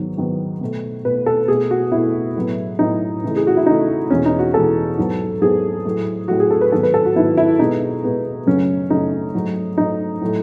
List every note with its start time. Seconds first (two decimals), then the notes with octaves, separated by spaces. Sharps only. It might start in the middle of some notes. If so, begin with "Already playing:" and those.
Already playing: G#2 D#3 F#3 B3
0.17 G#2 D#3 F#3 B3
0.61 B2 A3
1.05 B2 A3 B4
1.26 A4
1.48 B2 A3 G#4
1.71 F#4
1.92 B2 A3 E4
2.36 A2 F#3 B3
2.79 A2 F#3 B3 D#4
3.23 C#3 E3 A3
3.36 G#4
3.47 F#4
3.57 E4
3.66 C#3 E3 A3 D#4
4.10 E2 B2 G#3 C#4
4.26 D#4
4.39 F#4
4.54 E2 B2 G#3 A4
4.98 G#2 F#3 B3
5.41 G#2 F#3 B3 G#4
5.85 A2 F#3 A3
6.28 A2 F#3 A3 F#4
6.40 G#4
6.51 A4
6.61 B4
6.72 G#2 D#3 F#3 B3 A4
6.83 B4
6.94 A4
7.06 F#4
7.15 G#2 D#3 F#3 B3 E4
7.37 E4
7.59 B2 G#3 B3 D#4
8.04 B2 G#3 B3
8.47 F#2 C#3 F#3 A3 C#4
8.90 F#2 C#3 F#3 A3 D#4
9.34 G#2 F#3 A3
9.78 G#2 F#3 A3 D#4
10.21 A2 F#3 A3